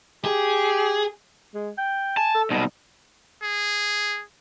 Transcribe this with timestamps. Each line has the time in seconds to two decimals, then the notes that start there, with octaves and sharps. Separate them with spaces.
0.25 G4 G#4
1.54 G#3
1.78 G5
2.17 G#5 A5
2.34 A4
2.50 C2 B2 D#4
3.43 G#4